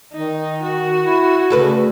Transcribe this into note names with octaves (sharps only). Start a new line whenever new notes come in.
D#3 D#4
F#4
E4
D2 C#3 A4 B4